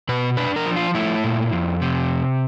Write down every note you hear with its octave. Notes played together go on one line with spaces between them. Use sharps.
B2 B4
D4 B4
A#4
F3
F4
A3 E4
A#2
F2
C3